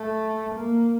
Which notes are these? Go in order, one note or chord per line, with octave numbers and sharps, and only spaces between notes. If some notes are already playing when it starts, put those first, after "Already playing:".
Already playing: A3
A#3